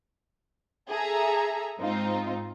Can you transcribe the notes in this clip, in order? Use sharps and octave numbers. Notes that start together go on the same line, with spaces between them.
G#4 A4 E5 A#5
G#2 C4 D#4 F4